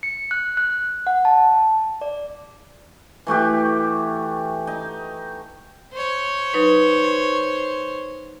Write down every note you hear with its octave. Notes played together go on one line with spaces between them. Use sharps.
C#7
F#6
F#6
F#5
A5
D5
E3 A3 F#4 G4
D#4
C5 C#5
F#3 D#4 B4
C#6